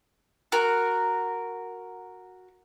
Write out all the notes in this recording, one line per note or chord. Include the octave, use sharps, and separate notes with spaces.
F#4 A#4